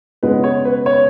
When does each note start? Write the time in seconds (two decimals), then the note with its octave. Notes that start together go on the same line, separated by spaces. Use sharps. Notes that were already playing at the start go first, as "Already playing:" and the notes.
0.23 C#3 G#3 B3 B4
0.44 C#5
0.65 B4
0.86 C#5